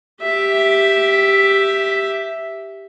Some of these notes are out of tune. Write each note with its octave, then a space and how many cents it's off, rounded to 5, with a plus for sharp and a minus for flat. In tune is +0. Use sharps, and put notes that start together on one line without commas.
G4 +0 E5 +0